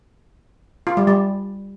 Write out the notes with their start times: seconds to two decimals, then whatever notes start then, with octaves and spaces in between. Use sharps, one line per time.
0.87 F4
0.97 G3
1.07 G3